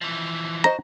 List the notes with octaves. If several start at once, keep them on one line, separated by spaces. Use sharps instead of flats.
E3 F3
F#4 C5 D#5 A#5